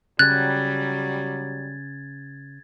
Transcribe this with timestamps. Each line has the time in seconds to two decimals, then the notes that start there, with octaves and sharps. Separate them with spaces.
0.19 C#3 F#3 G3 F#6 G#6 A6